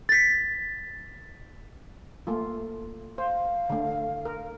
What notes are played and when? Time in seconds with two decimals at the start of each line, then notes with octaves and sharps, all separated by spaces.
0.09 A6 B6
2.27 A3 A#3 F4
3.18 C5 F5
3.70 D3 A3
4.25 A#4